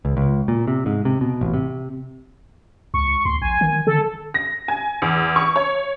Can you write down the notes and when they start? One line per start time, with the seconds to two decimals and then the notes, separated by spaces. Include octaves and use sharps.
0.05 C#2
0.17 C#2
0.48 A#2
0.68 C3
0.86 G#2
1.05 C3
1.21 B2
1.41 A1
1.54 C3
2.94 C#2 C#6
3.25 D2 C6
3.42 A#1 G#5
3.61 D#3
3.87 D3 A4
4.34 A#6
4.68 G#5
5.02 E2
5.36 C#6
5.56 C#5